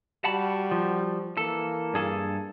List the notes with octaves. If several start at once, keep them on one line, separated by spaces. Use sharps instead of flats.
G3 F#4 F#5 A5 B5
F3
E3 A#3 A4
G2 G#4 A4